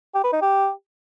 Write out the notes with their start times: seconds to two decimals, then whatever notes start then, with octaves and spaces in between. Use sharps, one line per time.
0.15 G4
0.24 B4
0.33 D#4
0.42 G4